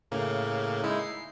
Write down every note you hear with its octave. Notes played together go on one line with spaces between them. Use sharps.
A2 C#3 A#3
G#3 D#4 E4
C7